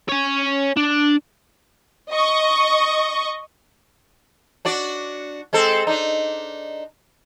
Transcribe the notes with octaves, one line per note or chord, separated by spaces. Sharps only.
C#5 G#5
D4
D#5 C#6
D4 F#4 D5
G#3 C4 A4
D4 D#4